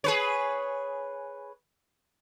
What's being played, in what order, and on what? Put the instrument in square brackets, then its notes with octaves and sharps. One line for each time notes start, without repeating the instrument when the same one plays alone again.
[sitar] G#4 B4 C#5